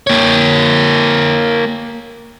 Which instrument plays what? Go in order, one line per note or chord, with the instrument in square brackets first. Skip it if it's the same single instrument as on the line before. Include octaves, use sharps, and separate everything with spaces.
[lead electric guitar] A#3 C#5